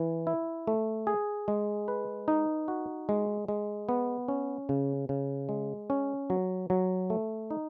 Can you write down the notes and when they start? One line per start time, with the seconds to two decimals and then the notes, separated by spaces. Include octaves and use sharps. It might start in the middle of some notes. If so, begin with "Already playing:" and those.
Already playing: E3
0.27 E4
0.67 A3
1.07 G#4
1.48 G#3
1.88 B4
2.28 D#4
2.68 F#4
3.09 G#3
3.48 G#3
3.89 B3
4.28 C#4
4.69 C#3
5.09 C#3
5.49 G#3
5.90 C#4
6.30 F#3
6.70 F#3
7.10 A3
7.51 D#4